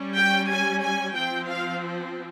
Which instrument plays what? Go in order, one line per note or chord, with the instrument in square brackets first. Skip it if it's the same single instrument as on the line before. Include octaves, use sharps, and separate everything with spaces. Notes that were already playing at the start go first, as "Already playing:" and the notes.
Already playing: [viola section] G3 C#4
G5
G#5
G#5
F3 C4 G5
F5